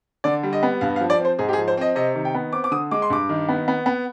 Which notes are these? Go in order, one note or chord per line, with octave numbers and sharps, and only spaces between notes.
D3 D5
G3
D#5
B3
G2 F5
F5
F3
D5
C4
C5
G#2 G#4
G4
G#4
F3
C5
C4 D#5
C3 D#5
D#3
G5
B3
C4 D6
D6
D3 D#6
G#3 D6
C6
G2 D6
D#3
B3
B3
B3